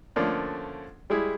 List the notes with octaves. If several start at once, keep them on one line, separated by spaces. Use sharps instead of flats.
D3 F3 A3 A#3 C#4 D4
G3 G#3 E4 G#4